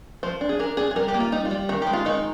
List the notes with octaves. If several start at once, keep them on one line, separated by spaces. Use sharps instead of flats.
F3 C5
D4
G#4
D4 A#4
D4 G#4
G#4
G3 A#4
G4
A#3
F4
G3 D#4
F4
G3
D#3 A#4
G4
G#3
F4
D#3 D#4